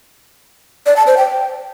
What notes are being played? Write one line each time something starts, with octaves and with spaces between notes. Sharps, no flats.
D5
A5
C5
G5